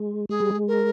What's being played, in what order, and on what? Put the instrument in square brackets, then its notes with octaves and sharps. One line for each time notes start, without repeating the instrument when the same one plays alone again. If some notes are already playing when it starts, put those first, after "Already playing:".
Already playing: [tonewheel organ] G#3
[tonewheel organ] G#3 [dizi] G#4
[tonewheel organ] G3
G#3
[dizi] A#4